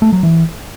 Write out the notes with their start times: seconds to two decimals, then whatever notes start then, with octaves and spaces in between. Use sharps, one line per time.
0.02 A3
0.13 F#3
0.23 E3